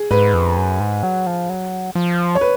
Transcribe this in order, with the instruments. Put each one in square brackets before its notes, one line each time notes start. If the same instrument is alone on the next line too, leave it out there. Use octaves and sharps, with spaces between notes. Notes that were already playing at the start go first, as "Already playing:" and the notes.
Already playing: [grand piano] G#4
[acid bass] G#2 [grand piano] B4
[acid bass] F2
F#2
G#2
F#3
F3
F#3
F3
[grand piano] C#5
B4